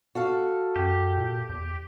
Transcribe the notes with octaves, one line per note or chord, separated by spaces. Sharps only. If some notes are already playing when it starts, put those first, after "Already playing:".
F#4 A4 F5
F#2 G4
A#2
E2